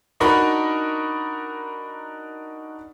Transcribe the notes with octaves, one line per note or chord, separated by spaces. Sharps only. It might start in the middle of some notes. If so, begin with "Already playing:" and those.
D4 D#4 F#4 A#4 B5